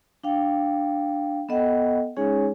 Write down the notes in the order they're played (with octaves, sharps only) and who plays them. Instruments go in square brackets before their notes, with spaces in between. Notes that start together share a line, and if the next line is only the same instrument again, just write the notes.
[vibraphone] D4 F5 G5
B3 A4 D#5 F#5 G5
G#3 C#4 D#4 G#4 C#5 G#5